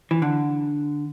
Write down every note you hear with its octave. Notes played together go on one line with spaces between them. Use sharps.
E3
D3